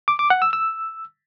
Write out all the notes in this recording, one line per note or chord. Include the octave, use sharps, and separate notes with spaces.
D6
D6
F#5
E6
E6